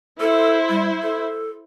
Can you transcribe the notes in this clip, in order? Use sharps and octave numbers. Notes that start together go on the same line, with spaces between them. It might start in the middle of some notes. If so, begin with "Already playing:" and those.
E4 A4 C5
G3
A4